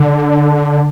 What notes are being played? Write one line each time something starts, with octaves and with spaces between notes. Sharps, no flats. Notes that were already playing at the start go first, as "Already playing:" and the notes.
Already playing: D3